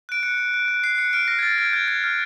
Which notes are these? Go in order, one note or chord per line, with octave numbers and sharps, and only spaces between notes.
F#6 D7
F#6 C#7
F#6
F#6
F#6
F#6 C7
F#6 C#7
F6 D7
F6 A#6
G#6
F6 A6
F6 G#6
G6 G#6
G6 G#6
F6